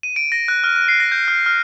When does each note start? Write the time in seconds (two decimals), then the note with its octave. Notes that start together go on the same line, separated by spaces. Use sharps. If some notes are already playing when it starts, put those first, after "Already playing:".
0.03 D#7
0.16 D7
0.32 A#6
0.48 F#6
0.64 F6
0.76 F#6
0.88 C7
1.00 A#6
1.12 G6
1.28 F6
1.46 F6